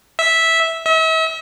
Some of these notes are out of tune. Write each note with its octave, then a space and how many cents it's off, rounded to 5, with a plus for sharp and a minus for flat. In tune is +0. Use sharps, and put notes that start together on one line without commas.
E5 -10
E5 -40